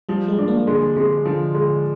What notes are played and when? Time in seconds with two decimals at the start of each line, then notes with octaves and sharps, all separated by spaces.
0.09 F3 G3
0.28 G#3
0.38 D4
0.48 A#3
0.67 D3 G#3
0.97 C3 G#3
1.25 D3 F3
1.55 G#3